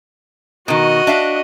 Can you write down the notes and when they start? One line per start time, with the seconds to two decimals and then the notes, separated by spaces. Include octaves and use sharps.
0.68 B2 D#3 F#4 D#5
1.07 D4 E5 F5